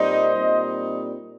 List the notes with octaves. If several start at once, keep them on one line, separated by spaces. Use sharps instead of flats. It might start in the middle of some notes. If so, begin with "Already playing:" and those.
Already playing: A#2 G3 C4 D#4 C5 D#5
A#2 G3 C4 D#4